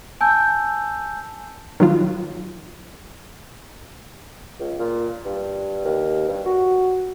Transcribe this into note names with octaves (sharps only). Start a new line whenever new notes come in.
G#5 A5 E6 G6
D#3 F#3 F4
C#2
A#2
G2
D#2
G2
F#4